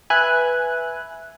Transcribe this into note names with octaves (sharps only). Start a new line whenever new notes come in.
B4 E5 G#5 F#6